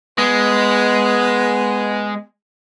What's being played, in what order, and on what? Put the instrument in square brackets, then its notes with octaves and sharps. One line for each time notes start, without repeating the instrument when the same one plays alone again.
[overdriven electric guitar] G#3 [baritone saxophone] B3